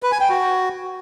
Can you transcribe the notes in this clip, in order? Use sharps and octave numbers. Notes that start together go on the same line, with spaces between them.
B4
G#5
G5
F#4